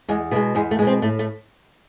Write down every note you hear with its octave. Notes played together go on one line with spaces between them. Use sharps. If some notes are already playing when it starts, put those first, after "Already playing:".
E2 G#3
B2 G#3 A3
E2 G#3
A3
B2 G#3
C4
A2 A3
A3